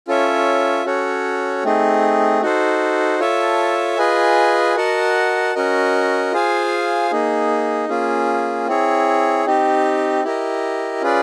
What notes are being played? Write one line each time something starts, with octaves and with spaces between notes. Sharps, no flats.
C#4 F4 A4 C#5 E5
C#4 F#4 A4 C#5
A3 C4 D#4 G#4
D#4 F#4 A4 C5
F4 A4 C#5 E5 A5
F4 G#4 B4 D#5 G#5
F#4 A#4 D#5 F#5 A5
C#4 F#4 A#4 D#5
F4 G#4 C5 F5 G#5
A#3 D#4 G#4
A#3 C#4 F4 G#4
C4 E4 G#4 C#5
C4 D#4 G4
E4 G4 A#4 D#5
C#4 F4 G#4 B4 D5